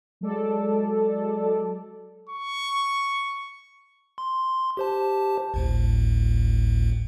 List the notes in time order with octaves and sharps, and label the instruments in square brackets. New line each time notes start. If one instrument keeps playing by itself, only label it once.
[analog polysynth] F#3 G#3 A4 D5
[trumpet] C#6
[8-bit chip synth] C6
G4 C5 A5
G#1 D2 A2